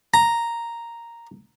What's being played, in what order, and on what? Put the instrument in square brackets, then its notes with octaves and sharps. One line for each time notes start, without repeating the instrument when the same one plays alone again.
[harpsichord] A#5